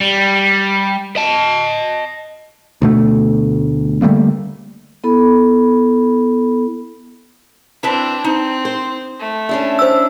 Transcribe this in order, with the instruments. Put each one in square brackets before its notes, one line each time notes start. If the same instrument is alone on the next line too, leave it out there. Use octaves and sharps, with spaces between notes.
[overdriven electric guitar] G3
D#5 A5
[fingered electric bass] D2 B2 A3
D3 G3 A3 A#3
[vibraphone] B3 E4 A4 B5
[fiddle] C4 D4 [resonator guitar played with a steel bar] E4 B4 A5
[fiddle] C4 [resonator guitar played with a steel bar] D#4
[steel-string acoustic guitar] C5
[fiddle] A3
[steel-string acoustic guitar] C#4 D4 E4
[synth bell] C5 E6